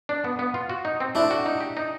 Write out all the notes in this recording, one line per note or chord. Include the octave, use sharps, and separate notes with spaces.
D4
B3
B3
F4
F#4
D#4
C4
A3 D4 E4
F#4
D#4
G4
D#4